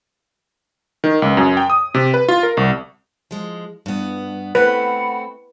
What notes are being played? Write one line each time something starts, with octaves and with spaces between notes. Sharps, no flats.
D#3
C#2
F#2
G5
D#6
C3
B4
F4
A#4
C2
F3 G#3
G2 B3
A3 C4 B4 F#5 B5